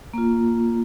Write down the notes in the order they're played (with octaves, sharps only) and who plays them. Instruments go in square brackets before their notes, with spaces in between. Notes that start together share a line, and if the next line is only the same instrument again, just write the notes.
[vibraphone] A#3 F4